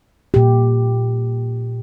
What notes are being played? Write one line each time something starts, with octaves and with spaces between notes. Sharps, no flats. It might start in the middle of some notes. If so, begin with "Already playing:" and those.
A#2 G4